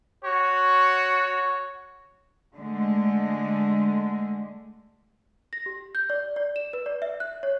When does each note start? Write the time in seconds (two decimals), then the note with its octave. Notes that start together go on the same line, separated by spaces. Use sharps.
0.24 F#4 C#5
2.54 D3 G#3 A3
5.53 A#6
5.66 G4
5.95 G6
6.10 D5
6.36 D5
6.56 E7
6.73 B4
6.86 D5
7.02 E5
7.20 F#6
7.43 C#5